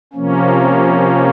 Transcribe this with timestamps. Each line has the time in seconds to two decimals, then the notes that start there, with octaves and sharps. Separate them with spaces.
0.13 C3 F3 A#3 C#4